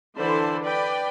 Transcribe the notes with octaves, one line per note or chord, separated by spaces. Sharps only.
D3 E3 C5 A5 B5 C6
B4 D5 G5 B5